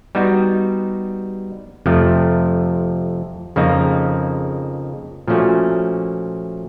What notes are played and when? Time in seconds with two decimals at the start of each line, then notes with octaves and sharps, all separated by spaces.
0.15 G3 B3 D#4 F#4
1.86 F2 C3 F3 A3
3.56 F2 C#3 F3 A#3 D#4
5.28 A#2 F3 A3 C#4 F#4